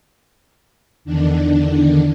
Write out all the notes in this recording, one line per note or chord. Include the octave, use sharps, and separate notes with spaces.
E2 D3 D#3 D4